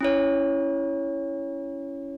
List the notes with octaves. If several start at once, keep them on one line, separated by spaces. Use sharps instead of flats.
C#4 E4 C#5